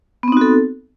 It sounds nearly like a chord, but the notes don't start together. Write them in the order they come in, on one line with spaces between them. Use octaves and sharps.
B3 C4 D#4 F#4 A4